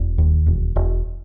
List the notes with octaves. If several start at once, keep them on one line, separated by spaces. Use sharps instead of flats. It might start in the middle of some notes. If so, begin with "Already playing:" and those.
Already playing: E1
D#2
E1
E1